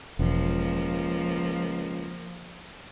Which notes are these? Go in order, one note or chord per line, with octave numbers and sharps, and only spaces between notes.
E1 C#2 F3 A#3